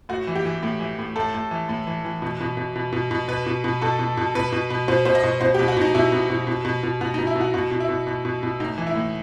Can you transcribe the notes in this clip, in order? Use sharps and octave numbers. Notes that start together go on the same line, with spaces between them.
A2 F#4
E3
G4
E3
A2
E3
A2
A2 A4
A2
E3
A2
E3
E3
B2
B2
B2
B2
B2
B2
B2 B4
B2
B2
B2 A4
B2
B2
B2 B4
B2
B2
B2 C5
B2 C5
D#5
B2
B2 C5
G4
B2
F#4
B2 D#4
B2 E4
B2
B2
B2
B2
B2
B2 F#4
D#4
B2
E4
B2
F#4
B2 F#4
B2
E4
B2
B2
B2
B2
A2 D#4
E3
E4
A2